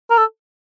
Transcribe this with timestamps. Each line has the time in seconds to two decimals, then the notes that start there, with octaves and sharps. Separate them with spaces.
0.11 A#4
0.18 A4